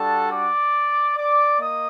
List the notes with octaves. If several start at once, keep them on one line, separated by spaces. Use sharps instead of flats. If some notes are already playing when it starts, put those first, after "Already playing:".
Already playing: G3 D4 F#4 A4 A5
D5 D6
D5 D6
A#3 D#5 D#6